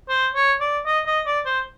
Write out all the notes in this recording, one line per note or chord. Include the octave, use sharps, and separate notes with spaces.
C5
C#5
D5
D#5
D#5
D5
C5